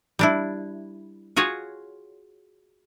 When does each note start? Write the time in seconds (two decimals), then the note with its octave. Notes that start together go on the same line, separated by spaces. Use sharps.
0.19 G3 D4 E4
1.36 F4 F#4 G#4 C#5